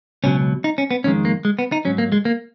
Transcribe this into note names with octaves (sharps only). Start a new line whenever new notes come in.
C#2 B2 F#3 C#4
D#4
C#4
B3
F2 D#3 G#3 C#4
A#3
G#3
B3
D#4
G#2 F#3 C#4
A#3
G#3
A#3